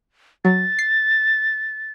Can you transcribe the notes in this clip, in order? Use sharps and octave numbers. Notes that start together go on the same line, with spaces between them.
F#3 A6
C7